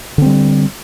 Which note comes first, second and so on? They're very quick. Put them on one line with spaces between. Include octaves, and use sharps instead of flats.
D3 C4 G3